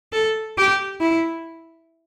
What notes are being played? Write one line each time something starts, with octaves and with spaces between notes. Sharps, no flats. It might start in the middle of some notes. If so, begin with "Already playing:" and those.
A4
G4
E4